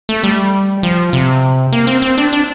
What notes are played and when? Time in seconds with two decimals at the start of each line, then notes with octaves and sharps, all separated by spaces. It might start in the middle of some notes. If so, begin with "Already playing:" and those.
0.09 A3
0.24 G3
0.83 F3
1.13 C3
1.73 A#3
1.87 C4
2.02 C4
2.18 D4
2.33 D4